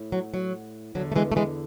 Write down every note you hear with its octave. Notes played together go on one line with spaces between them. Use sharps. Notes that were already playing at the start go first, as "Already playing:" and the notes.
Already playing: A2
F#3
F#3
E2 D3 F#3
A3
E3 G#3
A3
E3 G#3